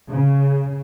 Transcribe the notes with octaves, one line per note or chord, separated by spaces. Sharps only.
C#3